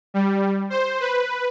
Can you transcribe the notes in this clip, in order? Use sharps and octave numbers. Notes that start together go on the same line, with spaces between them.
G3
C5
B4